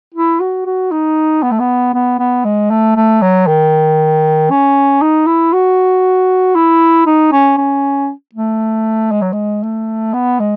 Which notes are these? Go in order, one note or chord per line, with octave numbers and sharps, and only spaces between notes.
E4
F#4
F#4
D#4
B3
A3
B3
B3
B3
G#3
A3
A3
F#3
D#3
C#4
D#4
E4
F#4
E4
D#4
C#4
C#4
A3
G#3
F#3
G#3
A3
B3
G#3